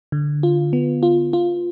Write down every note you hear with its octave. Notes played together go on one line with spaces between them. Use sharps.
D3
F4
B3
F4
F4